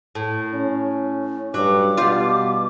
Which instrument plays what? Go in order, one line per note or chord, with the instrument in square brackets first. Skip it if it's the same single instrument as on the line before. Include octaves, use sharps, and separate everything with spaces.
[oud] A2
[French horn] C#4
[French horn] G2 [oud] F#3 [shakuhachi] D6
[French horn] B2 [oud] G3 F4